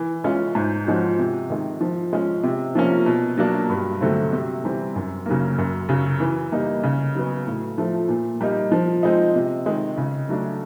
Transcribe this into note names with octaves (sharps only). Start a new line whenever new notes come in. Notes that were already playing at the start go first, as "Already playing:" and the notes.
Already playing: E3
G#3 C#4 F4
G#2
F3 G#3 C#4 F#4
C3
D#3 G#3
F3
G#3 C#4
C3
F3 A#3 C#4
B2
F#3 A#3 D4
G2
D3 F#3 A3 C4
C3
E3 G3 C4
F#2
C#3 F#3 A#3
F#2
C#3 F#3
E3
G3 A#3 D#4
C#3
F#3 B3
A2
F3 A3
A#2
G3 A#3 D#4
F3
G#3 C4 D#4
C3
D#3 G#3
C#3
F#3 A3 D4